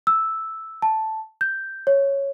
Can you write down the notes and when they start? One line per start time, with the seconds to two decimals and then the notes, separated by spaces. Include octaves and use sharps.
0.07 E6
0.82 A5
1.41 G6
1.87 C#5